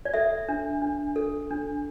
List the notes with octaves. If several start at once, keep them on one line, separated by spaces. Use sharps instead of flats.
D5
A4 E5
D4
D4
A4
D4